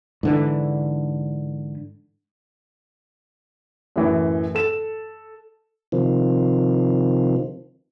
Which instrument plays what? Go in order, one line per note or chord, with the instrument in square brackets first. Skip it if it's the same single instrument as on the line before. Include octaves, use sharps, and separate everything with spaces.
[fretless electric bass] G#2 D3 E3
[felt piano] F#2 A2 E3
A4 E7
[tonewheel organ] C3 D#3 F3